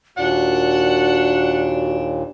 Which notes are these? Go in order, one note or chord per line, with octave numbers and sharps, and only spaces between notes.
D#2 A#2 D4 F#4 F#5